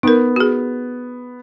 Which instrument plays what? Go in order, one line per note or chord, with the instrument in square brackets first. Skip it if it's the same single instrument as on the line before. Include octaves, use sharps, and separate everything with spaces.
[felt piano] B3 [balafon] D#4 A#4
[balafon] F#4 G#4